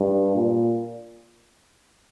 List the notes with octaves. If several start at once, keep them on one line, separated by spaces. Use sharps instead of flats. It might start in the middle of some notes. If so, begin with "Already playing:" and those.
Already playing: G2
A#2